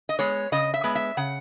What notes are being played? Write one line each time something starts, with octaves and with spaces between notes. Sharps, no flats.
D#5
G#3 B3 C#5
C#3 D#5
E5
G#3 B3
E5
C#3 F#5